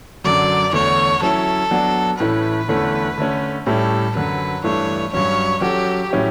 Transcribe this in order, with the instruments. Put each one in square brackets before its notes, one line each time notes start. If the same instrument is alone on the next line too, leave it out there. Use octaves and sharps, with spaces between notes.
[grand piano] F#2 D3 F#3 [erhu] D5
[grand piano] E2 D3 A3 [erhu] C#5
[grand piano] F#3 C#4 E4 [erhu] A4
[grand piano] F#3 B3 D4 F#4
[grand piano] A2 E3 A3 C#4 E4 [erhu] B4
[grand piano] E2 D3 A3 C#4 E4
D3 A3 C#4
[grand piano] A2 G3 C#4 E4 G4 [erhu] A4
[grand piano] F#2 D3 F#3 [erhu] B4
[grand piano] G2 E3 A3 D4 [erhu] C#5
[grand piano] G2 F#3 C#4 [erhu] C#5
[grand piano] F#3 C#4 F#4 A4 [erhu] G4
[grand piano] A2 F#3 C#4 E4 G4